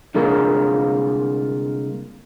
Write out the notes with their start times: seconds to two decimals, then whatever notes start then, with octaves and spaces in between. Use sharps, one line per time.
0.15 C2 D3 G#3 A#3 F4 A#4